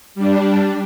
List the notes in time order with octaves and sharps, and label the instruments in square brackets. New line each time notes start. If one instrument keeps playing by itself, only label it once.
[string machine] G3 D4